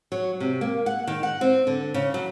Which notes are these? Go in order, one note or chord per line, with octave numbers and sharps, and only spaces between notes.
F#3
C3
A#3
F#5
D#3
F#5
C4
D3
C#3
F#3